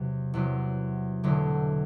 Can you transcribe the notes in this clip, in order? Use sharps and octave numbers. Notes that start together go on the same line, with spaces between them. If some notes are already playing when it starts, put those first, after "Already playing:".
Already playing: E2 C3 F#3
E2 C3 F#3
E1 E2 D3 F#3 A3